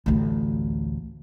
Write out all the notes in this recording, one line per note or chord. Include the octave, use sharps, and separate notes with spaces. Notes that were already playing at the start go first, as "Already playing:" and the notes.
A1 D2